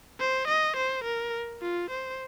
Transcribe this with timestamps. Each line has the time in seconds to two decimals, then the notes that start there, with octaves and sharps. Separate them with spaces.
0.20 C5
0.48 D#5
0.77 C5
1.04 A#4
1.62 F4
1.90 C5